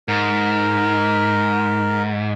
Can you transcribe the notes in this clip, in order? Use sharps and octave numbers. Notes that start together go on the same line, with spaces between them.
G#2 A#4